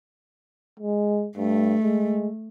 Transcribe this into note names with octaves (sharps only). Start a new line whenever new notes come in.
G#3
G2 A3
G#3